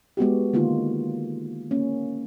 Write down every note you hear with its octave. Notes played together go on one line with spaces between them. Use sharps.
G#3 B3 F#4 G4
D3 D#3 A#3 D#4 F4
A#3 C#4